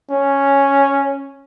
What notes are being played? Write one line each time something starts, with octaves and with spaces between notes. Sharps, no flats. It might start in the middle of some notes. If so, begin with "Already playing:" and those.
C#4